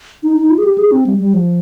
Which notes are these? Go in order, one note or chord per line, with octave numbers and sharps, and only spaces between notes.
D#4
D#4
F4
G#4
G4
G#4
C4
G3
G3
F3